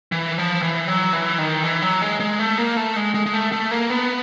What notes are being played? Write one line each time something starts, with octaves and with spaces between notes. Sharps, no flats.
E3
F3
E3
F#3
E3
D#3
E3
F#3
G#3
G#3
A3
A#3
A3
G#3
G#3
G#3
A3
A3
A#3
B3